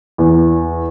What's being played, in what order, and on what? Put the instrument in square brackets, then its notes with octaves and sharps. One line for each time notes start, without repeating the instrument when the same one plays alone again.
[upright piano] E2